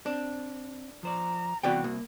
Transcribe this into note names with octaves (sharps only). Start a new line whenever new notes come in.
C4 D4
F3 C5 D5 A#5
C2 E3 B3 C4 F#4 D5 G5
C2 A#3